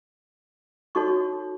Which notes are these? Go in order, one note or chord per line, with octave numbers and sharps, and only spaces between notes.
D#4 F#4 A4 C#5 C#6